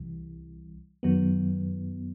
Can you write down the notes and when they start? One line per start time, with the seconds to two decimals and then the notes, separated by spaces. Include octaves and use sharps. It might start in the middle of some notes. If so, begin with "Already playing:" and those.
Already playing: C2 C3 E3 G3
1.03 F#2 D#3 F#3 B3